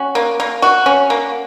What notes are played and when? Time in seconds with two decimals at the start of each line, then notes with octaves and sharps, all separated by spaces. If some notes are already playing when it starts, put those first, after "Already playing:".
Already playing: C#4 F#4
0.15 A#3
0.40 A#3
0.62 F#4
0.86 C#4
1.10 A#3